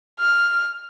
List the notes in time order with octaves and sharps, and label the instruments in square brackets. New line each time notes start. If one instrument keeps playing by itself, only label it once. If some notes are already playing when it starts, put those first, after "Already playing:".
[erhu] F6